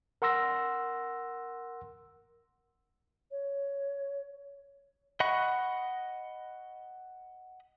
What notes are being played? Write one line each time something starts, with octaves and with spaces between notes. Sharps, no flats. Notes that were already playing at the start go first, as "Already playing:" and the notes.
A#4 F#5 C6 E6 A#6
C#5
D#5 F#5 B5 C#6